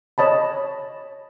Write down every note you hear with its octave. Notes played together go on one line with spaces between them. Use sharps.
C#5 D#5 A5 B5